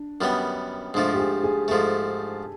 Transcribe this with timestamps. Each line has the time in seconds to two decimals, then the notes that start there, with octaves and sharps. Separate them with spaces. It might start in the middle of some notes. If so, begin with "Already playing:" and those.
Already playing: D4
0.21 F#2 D#3 G3 B3
0.94 G#2 F3 A3 D4
1.14 G4
1.20 G#4
1.44 G#4
1.68 G#2 F3 A3 A4